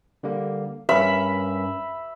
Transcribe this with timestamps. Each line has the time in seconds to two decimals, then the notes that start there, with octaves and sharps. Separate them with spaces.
0.23 D3 G3 A#3
0.89 G2 C#4 A#4 E5 B5